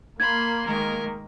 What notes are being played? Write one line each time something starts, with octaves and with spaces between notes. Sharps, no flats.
A#3 B5 C6 G#6
D#3 G#3 A#4